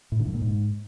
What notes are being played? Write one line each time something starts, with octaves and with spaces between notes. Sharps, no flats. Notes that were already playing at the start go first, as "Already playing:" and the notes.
A2
D3
G2
A#2
G#2